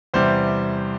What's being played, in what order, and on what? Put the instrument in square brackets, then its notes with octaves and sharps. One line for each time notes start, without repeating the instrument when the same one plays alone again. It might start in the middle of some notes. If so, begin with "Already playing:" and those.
[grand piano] E2 C3 G3 C5